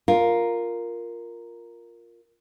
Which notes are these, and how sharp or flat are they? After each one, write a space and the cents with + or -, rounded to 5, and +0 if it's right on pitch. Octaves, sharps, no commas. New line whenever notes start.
F4 +0 A#4 +0